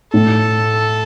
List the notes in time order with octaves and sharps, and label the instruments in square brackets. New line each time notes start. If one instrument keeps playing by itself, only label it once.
[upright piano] A2 [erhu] A4